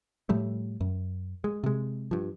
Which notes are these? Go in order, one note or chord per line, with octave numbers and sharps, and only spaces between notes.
A2 F3 G3 A3
F#2
G#3
C3 G#3
G2 F3